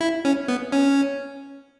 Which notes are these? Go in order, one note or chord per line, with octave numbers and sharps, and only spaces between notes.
E4
C#4
B3
C#4